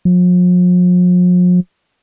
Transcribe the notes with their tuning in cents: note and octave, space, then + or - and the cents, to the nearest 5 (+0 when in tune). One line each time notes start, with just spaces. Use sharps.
F3 +45